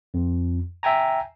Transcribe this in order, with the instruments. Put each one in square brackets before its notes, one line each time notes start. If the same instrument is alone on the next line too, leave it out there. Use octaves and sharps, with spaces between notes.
[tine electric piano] F2
E5 G5 G#5 A#5